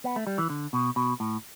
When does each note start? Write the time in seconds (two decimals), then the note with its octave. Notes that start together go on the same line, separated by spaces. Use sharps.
0.04 B3
0.16 A3
0.27 G3
0.38 E3
0.50 D3
0.73 B2
0.96 B2
1.20 A2